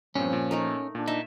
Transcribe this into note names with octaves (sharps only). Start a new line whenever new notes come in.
G2 A#2 F3 C4 C#4
A#2
A3 D#4 A#4
A#2 D4
D#4 E5